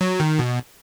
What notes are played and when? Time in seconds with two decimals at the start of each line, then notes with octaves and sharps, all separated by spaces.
0.01 F#3
0.20 D#3
0.39 B2